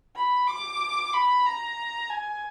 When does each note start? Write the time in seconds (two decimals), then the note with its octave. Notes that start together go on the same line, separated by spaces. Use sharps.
0.15 B5
0.47 D6
1.13 B5
1.46 A#5
2.10 G#5